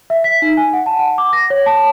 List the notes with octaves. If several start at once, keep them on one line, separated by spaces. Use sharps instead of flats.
E5
B6
D#4
G#5
F#5
A5
F#5
D6
A#6
C#5
A5